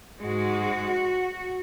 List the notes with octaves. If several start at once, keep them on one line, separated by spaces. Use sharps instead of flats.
G#2 G#3 F#4